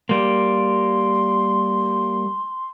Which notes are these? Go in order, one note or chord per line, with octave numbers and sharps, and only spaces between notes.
G3 A#3 C6